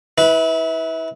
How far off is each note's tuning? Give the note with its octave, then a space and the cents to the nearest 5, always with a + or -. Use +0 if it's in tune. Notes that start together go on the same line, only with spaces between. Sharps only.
E4 -30 B4 +0